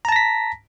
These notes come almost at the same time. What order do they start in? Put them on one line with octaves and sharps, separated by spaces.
A#5 A5 A#6 B6